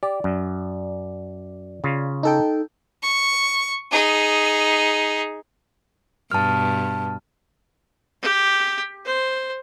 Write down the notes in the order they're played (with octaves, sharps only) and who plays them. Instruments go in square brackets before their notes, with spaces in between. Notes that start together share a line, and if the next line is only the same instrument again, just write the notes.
[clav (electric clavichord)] G4 [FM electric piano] D5
[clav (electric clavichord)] F#2
C#3 F4
[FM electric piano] D#4 A4 G5
[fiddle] C#6
D#4 G#4
[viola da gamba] G2 B2 [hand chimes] A5 F6
[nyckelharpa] G4
C5